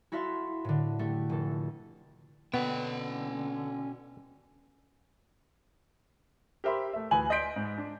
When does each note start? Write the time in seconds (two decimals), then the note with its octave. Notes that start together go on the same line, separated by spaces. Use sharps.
0.12 E4 F#4 A4 E5 F5 C6
0.64 A2 D3
0.99 A3 G4
1.29 F1 A4
2.54 B2 D3 B3 C#4 G5
6.64 G4 A#4 C5 E5 B5 C6
6.93 A3 E5
7.11 D2 E3 B4 G#5 B5 F#7
7.30 D5 D#5 C6 G6 B6 D7
7.56 G#2
7.78 D4